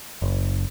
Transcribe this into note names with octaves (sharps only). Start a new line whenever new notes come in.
F#1